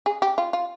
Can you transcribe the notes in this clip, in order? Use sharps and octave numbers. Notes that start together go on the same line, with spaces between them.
G#4
G4
F4
F4